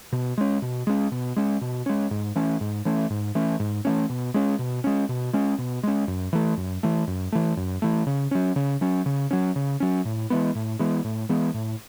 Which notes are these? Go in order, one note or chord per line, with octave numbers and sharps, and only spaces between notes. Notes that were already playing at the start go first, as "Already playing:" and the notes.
B2
G#3 C#4
B2
G#3 C#4
B2
G#3 C#4
B2
G#3 C#4
G#2
E3 A3 C#4
G#2
E3 A3 C#4
G#2
E3 A3 C#4
G#2
E3 A3 C#4
B2
G#3 C#4
B2
G#3 C#4
B2
G#3 C#4
B2
G#3 C#4
F#2
E3 A3
F#2
E3 A3
F#2
E3 A3
F#2
E3 A3
C#3
F#3 C#4
C#3
F#3 C#4
C#3
F#3 C#4
C#3
F#3 C#4
A2
E3 G#3 B3
A2
E3 G#3 B3
A2
E3 G#3 B3
A2